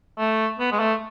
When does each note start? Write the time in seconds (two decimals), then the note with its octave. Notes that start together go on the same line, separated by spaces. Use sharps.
0.18 A3
0.59 B3
0.72 G#3
0.80 A3